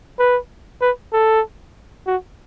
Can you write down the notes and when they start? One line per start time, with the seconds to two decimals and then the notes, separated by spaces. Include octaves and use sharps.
0.19 B4
0.81 B4
1.13 A4
2.07 F#4